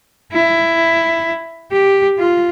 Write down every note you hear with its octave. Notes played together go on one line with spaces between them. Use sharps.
E4
G4
F4